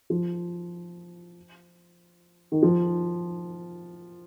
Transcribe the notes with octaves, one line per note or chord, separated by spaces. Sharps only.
F3
D#3
F3